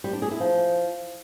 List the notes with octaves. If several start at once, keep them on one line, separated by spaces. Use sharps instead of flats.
G3
D4
G#4
E4
F3